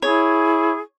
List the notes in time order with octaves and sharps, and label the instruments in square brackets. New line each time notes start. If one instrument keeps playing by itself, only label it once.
[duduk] E4 [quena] G#4 [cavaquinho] C#5